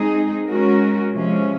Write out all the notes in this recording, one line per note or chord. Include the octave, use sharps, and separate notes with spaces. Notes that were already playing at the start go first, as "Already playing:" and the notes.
Already playing: G#3 C4 D#4 G#4
G#3 C#4 F#4 A#4
C3 F3 G#3 C#4